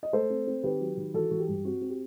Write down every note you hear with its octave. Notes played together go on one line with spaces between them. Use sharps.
D#5
A3 A4 C5
C4
C4
D#3 G4 B4
F#3
D#3
E3 F#4 A4
E3 F#4
G4
G2
C4 F#4
C4
G4